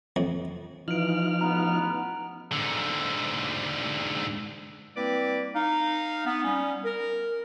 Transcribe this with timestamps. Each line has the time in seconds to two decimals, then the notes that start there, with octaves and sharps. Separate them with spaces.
0.16 F2
0.88 E3 F3 D#4 F6 D7 F#7
1.41 A1 B3 A#5 F7
2.52 G#2 D3
4.96 G3 A#3 C4 E4 B4 D5
5.54 D#4 F5
6.25 B3
6.44 G3 C#4
6.85 A#4